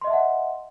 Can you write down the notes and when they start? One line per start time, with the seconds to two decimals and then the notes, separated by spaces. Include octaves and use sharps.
0.01 C6
0.04 D#5
0.07 E5
0.10 A5
0.13 F#5